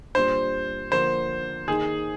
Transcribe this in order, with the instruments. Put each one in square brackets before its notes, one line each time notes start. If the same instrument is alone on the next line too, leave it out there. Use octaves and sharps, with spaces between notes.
[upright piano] A#2 G3 D4 [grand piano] C5
[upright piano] D3 F3 A#3 [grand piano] C5
[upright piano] D#3 A#3 D#4 [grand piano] G#4